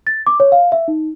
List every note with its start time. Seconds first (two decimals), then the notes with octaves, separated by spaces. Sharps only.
0.07 A6
0.27 D6
0.40 C#5
0.52 F5
0.72 E5
0.88 D#4